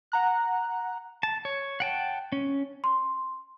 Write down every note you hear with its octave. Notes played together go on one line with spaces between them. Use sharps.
F#5 A#5 F#6
A5
C#5
F#5 G5 A5
C#4
C6